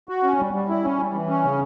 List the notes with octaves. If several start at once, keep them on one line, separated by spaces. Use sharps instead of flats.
F#4
C#4
G3
G3
E4
C#4
G3
E3
C#4
C#3